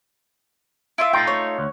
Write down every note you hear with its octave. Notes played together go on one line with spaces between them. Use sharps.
E4 F4 E5
A3 D#4 F4 G5
C#5
D2